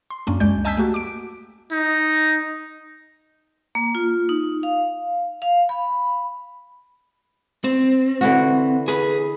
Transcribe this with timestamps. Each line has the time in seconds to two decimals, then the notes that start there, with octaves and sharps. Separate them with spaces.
0.10 C6
0.27 F#2 A#3 C#4 D4
0.40 C#2 F#2 G#3 D5 G6
0.65 D#5 G#5 A5 E6 G6 B6
0.77 A3 A#3 F#4 G4
0.94 D6 D7
1.72 D#4
3.75 A#3
3.95 F4
4.29 D#4
4.63 F5
5.42 F5
5.69 B5
7.64 C4
8.21 D3 E3 F#4
8.88 G#4 B4